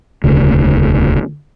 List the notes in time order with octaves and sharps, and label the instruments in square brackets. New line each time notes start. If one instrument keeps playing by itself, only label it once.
[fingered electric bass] E1 D2 C#3